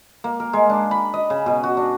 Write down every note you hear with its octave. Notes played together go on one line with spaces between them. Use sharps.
A#3
A#4
G#3
D4
B5
D#5
C#3
B2
F#4
D4